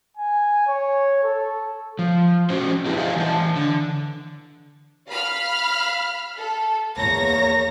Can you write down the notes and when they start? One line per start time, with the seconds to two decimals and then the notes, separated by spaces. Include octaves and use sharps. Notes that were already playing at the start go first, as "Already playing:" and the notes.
0.17 G#5
0.67 C#5
1.23 A4
1.99 F3
2.50 C#4 F#4 C5
2.86 B3 D4 E4 G4 G#4 B4
2.97 C5 D5 D#5 F5 F#5 G#5
3.16 E3 G#5 A5
3.56 D3
5.09 F5 B5 F6
6.38 A4
6.96 E2 A#3 C#5 A#5 A#6